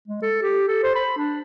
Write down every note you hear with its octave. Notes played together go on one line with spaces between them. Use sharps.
G#3
A4
G4
A4
C5
B5
D4